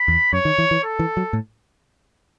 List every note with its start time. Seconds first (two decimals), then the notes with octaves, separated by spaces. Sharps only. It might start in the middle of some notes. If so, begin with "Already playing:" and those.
Already playing: B5
0.08 E2
0.33 F#2 C#5
0.45 D#3
0.58 E3
0.71 E3
0.84 A4
0.99 E3
1.17 F#3
1.33 A2